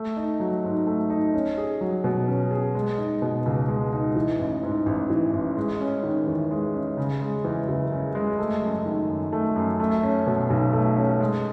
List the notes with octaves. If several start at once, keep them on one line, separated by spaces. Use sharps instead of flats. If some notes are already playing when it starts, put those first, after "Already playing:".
Already playing: A3
D#4
F#3
G#2
A3
D#4
C#4
G#4
F#3
B2
C#4
G#4
G#3
D#4
B2
C#2
G#3
D#4
E3
A1
G#2
A1
E3
A1
G#3
C#4
D#3
E2
G#3
C#4
C#3
G#3
E2
F#1
C#3
G#3
A3
F#2
D#3
F#2
A3
F#2
A3
C#4
B2
B1
A3
C#4
G#3